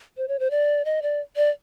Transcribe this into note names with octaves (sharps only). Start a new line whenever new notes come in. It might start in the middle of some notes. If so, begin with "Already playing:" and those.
C5
C#5
C5
D5
D#5
D5
D5